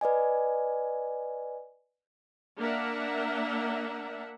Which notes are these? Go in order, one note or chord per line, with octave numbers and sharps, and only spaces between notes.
B4 D5 D#5 G#5
A#3 D4 A#4 E5 F#5